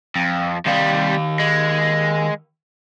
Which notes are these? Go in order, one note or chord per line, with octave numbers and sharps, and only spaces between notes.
F2
C3 D#3 G3 F5
G#3